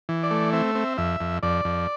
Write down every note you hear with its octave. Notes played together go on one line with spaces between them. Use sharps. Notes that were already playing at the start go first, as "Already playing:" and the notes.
E3
D5
A3
C4 E5
C4
F2 E5
F2
F2 D5
F2